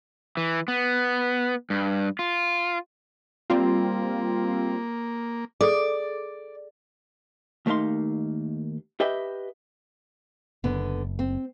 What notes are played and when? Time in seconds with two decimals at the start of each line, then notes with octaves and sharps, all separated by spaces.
0.37 E3
0.68 B3
1.70 G2
2.19 F4
3.50 G3 A#3 C4 F4
5.61 G#4 A4 D5 D6
7.66 D#2 A3 A#3 D#4 F5 C6
9.00 G4 B4 D#5 E5 G5
10.64 F#1 D3 B3
11.19 C4